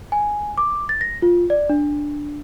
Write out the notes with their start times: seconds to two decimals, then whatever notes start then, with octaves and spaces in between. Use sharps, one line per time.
0.12 G#5
0.58 D6
0.89 A6
1.01 A#6
1.22 F4
1.50 D5
1.70 D4